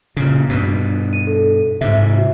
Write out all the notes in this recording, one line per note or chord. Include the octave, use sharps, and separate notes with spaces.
A#2 C#3
G2 B2
D#7
A4
G#2 C3 E5
F#4